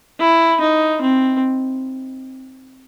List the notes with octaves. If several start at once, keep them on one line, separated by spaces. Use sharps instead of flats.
E4
D#4
C4